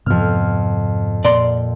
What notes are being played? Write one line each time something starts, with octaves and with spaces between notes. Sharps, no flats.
F2 G#2 C3 B3 F6
A#2 D5 A#5 C6